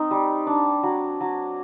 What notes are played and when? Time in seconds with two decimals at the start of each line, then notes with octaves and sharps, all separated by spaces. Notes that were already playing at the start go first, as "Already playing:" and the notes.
Already playing: C4 D#4
0.11 G3
0.47 D4
0.83 F#3
1.21 F#3